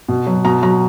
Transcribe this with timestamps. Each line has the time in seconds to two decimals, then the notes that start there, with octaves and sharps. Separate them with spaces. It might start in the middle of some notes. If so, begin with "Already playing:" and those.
0.08 B2
0.27 F#3
0.45 B2 A#5
0.62 F#3 A#5